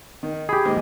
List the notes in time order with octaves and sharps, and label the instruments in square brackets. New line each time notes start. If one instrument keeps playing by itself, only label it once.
[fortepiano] D#3
[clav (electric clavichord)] G4 G#4 [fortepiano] B5
[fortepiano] D#2 G#2 D#5